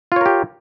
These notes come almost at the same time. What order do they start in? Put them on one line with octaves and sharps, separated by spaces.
F4 C#5 A#4 G4